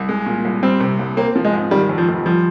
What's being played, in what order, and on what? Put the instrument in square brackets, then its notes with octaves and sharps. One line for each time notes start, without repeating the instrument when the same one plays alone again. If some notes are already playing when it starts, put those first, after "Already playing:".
Already playing: [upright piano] C2
G#3
A#2
C2
[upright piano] G3 [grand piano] C4
[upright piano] C3
C2
[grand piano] A#3 [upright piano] C4
[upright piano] F3
[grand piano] G#3
[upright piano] G#2
[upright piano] D#3 [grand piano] G3
[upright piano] F2
[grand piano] F3
[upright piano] F1
[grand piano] F3 [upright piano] G3